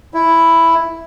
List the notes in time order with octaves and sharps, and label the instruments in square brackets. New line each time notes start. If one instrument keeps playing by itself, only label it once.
[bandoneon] E4